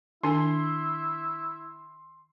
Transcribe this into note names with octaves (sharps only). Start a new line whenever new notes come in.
D#3 D4 E4 G#5 C6